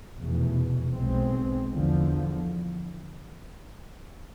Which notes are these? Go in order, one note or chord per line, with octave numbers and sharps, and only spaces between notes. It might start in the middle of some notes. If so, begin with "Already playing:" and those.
F1 E2 B2
B1 B2 G#3 C4
E2 D3 F3